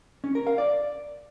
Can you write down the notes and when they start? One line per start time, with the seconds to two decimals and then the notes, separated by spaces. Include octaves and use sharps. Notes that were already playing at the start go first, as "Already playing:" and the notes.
0.24 C#4
0.35 A#4
0.47 F5
0.58 D5